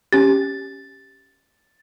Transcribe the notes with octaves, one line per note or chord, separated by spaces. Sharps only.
C#4 G4 A6